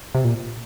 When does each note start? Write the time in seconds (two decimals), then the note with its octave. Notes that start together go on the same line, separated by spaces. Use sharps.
0.15 C3
0.25 A#2